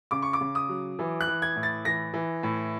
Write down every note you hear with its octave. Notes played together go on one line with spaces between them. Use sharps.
C#3 D6
C#6
D6
C#3
D#6
F#3
E3
F#6
E3
G#6
A2
A6
E3 A#6
E3
A2